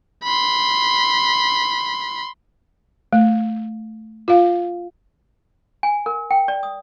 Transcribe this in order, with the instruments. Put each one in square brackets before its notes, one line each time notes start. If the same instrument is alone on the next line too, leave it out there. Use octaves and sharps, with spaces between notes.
[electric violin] B5 C6
[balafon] A3
F4 F5
[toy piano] G#5
A#4
G5
D5
D#6